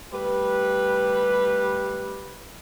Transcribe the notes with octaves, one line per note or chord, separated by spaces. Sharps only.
G3 A3 G4 B4